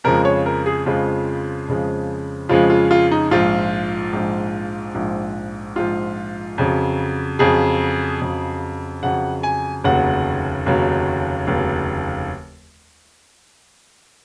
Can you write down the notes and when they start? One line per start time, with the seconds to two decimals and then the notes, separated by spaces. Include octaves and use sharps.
0.04 F2 C#3 F3 G#3 A#4
0.25 C#5
0.46 A#4
0.66 G#4
0.86 F2 C#3 F3 G#3 F4
1.68 F2 C#3 F3 G#3
2.49 F2 C#3 F3 G#3 F4
2.70 F4
2.91 F4
3.11 D#4
3.31 A#1 G#2 F3 F4
4.13 A#1 G#2 F3
4.94 A#1 G#2 F3
5.76 A#1 G#2 F3 F4
6.58 F2 C#3 F#3
7.39 F2 C#3 F#3 G#4
8.21 F2 C#3 F#3
9.03 F2 C#3 F#3 F#5
9.43 G#5
9.84 F1 D#2 C#3 F#3 F#5
10.66 F1 D#2 C#3 F#3
11.47 F1 D#2 C#3 F#3